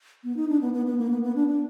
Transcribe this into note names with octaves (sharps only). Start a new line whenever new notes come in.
B3
D#4
D4
B3
B3
B3
A#3
B3
B3
D4
D4